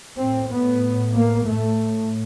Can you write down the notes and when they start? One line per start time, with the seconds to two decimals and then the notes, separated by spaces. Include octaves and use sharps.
0.18 A2 C4
0.50 B3
1.15 A#3
1.47 A2 A3